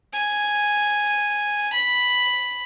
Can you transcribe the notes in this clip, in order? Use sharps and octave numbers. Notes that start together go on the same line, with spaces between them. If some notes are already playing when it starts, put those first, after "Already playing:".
G#5
B5